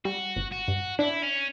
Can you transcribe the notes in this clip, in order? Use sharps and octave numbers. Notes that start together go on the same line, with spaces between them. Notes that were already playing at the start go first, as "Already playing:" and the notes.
G3 F#4
G1
F#4
G2
D4 E4
C#4